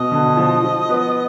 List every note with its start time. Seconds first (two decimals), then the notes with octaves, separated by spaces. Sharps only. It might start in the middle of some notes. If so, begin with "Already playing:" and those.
Already playing: B2 D#5
0.11 D3
0.37 F3
0.63 F3
0.89 B3